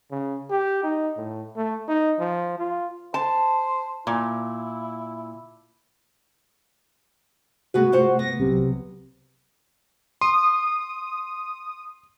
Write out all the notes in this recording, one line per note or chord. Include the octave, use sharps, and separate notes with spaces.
C#3
G4
D#4
A2
A3
D#4
F3
F4
C5 A5
A#2 E4
C3 G#3 A3 B3 F#4 G#4 B4
F4 C5 F#5
B3 A#6
C2 C3 F#3
C6 D#6